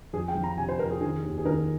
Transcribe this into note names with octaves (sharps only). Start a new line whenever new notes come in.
F2 G#4
G5
F3
A#5
C3 G#5
C5
F2 A#4
G#4
D#3 G#4
D#2
G#4
D#3 A#4